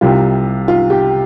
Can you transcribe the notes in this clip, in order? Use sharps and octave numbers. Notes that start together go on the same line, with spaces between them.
C2 C3 G3 F4
F4
G4